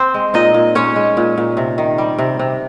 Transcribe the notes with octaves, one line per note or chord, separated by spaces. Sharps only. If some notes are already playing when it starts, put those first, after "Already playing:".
Already playing: C4 C5
G#3
A#2 D#4 D#5
A#2
G#3 C#4 C#5
G#3
A#2
A#2
C3
D#3
G3
C3
C3